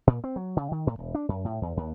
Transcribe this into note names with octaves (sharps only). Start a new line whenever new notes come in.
A#2
C4
F#3
C#3
D#3
A2
E1
D4
F#2
A2
E2
D#2